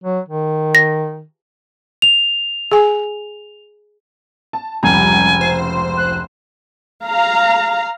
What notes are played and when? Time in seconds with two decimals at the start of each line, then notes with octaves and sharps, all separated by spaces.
0.04 F#3
0.29 D#3
0.75 A#6
2.02 F7
2.72 G#4 G#5
4.53 A5
4.83 F1 C#2 G3 G#5 A#5
5.41 C5
5.97 F#6
7.04 F5 A#5